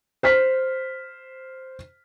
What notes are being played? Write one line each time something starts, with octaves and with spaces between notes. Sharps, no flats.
C5 F6 B6